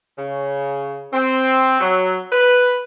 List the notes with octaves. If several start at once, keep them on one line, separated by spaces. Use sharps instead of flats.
C#3
C4
F#3
B4